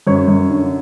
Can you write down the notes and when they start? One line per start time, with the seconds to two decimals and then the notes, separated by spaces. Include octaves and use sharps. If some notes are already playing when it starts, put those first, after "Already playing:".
0.07 F#2 C#5
0.28 F#2
0.50 D3